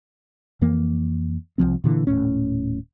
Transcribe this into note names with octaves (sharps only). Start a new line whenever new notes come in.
F2 E3 A#3
C2 F#2 F3 C4
A#2 D3 E3
D#1 G#1 A2 C#4